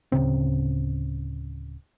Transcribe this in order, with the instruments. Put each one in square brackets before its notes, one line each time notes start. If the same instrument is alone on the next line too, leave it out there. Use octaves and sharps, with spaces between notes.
[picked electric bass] D1 G1 C#3 C4